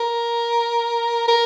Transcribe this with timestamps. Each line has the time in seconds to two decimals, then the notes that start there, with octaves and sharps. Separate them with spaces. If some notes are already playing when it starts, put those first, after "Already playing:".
Already playing: A#4
1.28 A#4